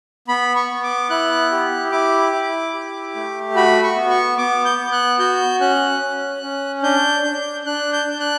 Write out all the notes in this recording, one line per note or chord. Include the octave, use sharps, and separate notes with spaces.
B3 B5
C#6
B3
D6
E4 F#6
G4
E4 D6
E4
G4
A3
F#4 B5
C#6
B3
C#6
B3 D6
G6
B3
F#6
F#4 G6
C#4 F#6
C#4
C#4
D4 G6
D4
D4 F#6
G6
D4
F#6